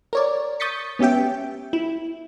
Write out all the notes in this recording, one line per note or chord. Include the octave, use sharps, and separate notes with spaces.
A#4 C#5 D5
C#6 D#6 G6 A6 B6 C#7
B3 C#4 G4 E5 G5
E4